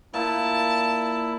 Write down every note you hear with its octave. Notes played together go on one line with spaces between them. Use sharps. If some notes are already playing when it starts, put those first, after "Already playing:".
A#2 E4 A5